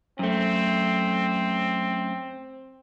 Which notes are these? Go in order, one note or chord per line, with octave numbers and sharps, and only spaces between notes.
F#2 A3 C4